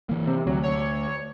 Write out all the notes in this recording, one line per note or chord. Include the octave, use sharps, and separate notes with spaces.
E3 A#3
C3
D2 F#3
C#5